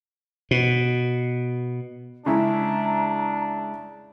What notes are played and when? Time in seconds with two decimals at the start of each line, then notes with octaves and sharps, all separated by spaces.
0.51 B2
2.26 C#3 G#3 D4 E4 G#4 A#5